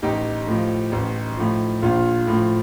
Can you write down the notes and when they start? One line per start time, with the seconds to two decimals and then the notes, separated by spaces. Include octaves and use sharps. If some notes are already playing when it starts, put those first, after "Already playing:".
0.02 A1 D#4 G4
0.47 A2 F3
0.92 A1
1.37 A2 F3
1.82 A#1 F4
2.27 A2
2.32 F3